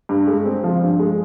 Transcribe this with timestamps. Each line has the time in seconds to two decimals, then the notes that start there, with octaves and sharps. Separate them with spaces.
0.09 G2
0.27 G#3
0.45 C4
0.64 F3
0.81 G2
0.99 G#3